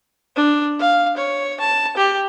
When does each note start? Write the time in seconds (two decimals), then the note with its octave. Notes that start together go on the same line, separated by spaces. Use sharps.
0.36 D4
0.79 F5
1.17 C#5
1.60 A5
1.97 G4